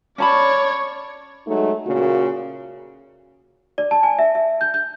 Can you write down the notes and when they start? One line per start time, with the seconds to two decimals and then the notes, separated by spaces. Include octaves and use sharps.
0.18 C#4 C#5 D5 A5 B5
1.47 F#3 G#3 A3 D#4
1.87 A#2 C#3 A#3 F#4
3.78 D5
3.91 A5
4.03 G#5
4.19 E5
4.35 E5
4.61 G6
4.74 G6